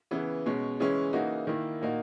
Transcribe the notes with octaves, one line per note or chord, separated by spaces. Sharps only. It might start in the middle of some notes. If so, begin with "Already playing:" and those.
C#3 E3 B3
B2 G#3 C#4
C#3 E3 G#3 C#4
C#3 E3 A#3 D#4 F#4
D#3 A#3 E4
A#2 A#3 D#4 F#4